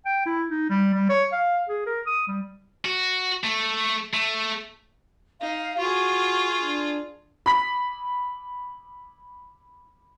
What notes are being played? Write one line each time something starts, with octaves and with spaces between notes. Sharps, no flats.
G5
E4
D#4
G3
G3
C#5
F5
G#4
A#4
D#6
G3
F#4
A3
A3
D#4 F5
F4 F#4 G#4 C#6
D4
B5 B6